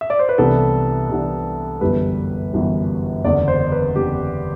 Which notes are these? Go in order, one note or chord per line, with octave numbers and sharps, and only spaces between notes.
E5
D5
C5
B4
C2 C3 E3 B3 D4 A4
C2 C3 E3 B3 D4
G1 F#2 E3 G3 B4
G1 F#2 E3 G3
F#1 E2 D3 D5
C5
B4
F#1 E2 D3 G4